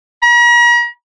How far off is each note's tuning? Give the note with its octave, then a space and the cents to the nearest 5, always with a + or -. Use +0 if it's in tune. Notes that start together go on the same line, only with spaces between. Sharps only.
A#5 +45